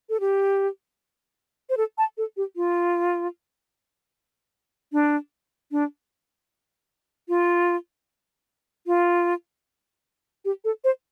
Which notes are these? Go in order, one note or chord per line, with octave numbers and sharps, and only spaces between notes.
A4
G4
C5
A4
A5
A4
G4
F4
D4
D4
F4
F4
G4
A4
C5